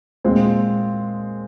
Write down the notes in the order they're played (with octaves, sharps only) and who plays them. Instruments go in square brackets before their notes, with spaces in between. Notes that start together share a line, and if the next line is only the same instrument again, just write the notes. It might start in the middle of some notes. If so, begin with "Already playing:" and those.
[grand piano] A#2 G#3 C4 F4